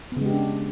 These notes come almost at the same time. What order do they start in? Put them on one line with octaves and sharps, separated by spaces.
B3 C#3 G#3 G4 D4